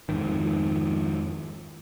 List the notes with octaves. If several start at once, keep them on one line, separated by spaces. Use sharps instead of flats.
F2 G#2 D#3